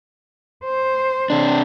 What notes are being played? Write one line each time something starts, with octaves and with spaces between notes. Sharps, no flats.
C5
C3 D4